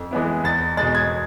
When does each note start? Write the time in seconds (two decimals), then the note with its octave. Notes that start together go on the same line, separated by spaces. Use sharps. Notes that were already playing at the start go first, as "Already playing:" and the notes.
Already playing: F2
0.11 E3 G#3 B3 E4
0.44 E2 A6
0.77 B2 G#3 A6
0.95 G#6